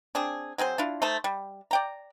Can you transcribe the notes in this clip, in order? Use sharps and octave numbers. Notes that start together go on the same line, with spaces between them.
C4 D4 G#4
F#3 C4 G#4 C5
D4 E4 F4
A3 D#4 C5 A5
G3
D5 G5 A#5